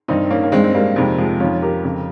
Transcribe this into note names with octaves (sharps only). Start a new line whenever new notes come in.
G2 D#3 C4 D#4
A#3 C#4
A#3
G2 D#3 G#3 C4
C4
G3 A#3
F2 C3 D#3 G#3 C4
F3 G#3
F2 D#3 C#4 F4
G4 A#4
F2 C#3